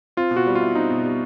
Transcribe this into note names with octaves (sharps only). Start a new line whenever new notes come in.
C4 F4
B2
F#4
G3
F4
E4
C4 D#4
B2
G3